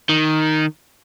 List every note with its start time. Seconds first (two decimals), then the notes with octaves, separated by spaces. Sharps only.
0.09 D#3